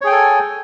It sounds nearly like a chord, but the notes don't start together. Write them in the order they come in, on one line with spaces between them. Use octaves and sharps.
C#5 G#4 G5 G#5 A4